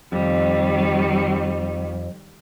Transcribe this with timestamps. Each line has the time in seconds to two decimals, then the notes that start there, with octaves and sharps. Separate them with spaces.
0.12 F2 D#3 G3